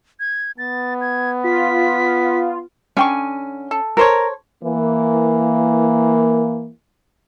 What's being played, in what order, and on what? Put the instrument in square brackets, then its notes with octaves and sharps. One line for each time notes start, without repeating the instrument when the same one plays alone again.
[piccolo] G#6
[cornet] B3 [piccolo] A6
[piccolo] G#6
[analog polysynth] F4 [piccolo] B6
[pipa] D3 G5 C#6 [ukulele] C#4 G#5
[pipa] A4
[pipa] A4 C5 C#5 [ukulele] A#4
[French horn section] E3 A#3